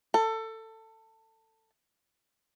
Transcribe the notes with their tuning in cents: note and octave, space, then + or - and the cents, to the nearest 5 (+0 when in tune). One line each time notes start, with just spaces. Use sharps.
A4 +20